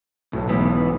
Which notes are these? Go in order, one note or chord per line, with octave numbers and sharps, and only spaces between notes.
B1 A2
G#2 E3 B3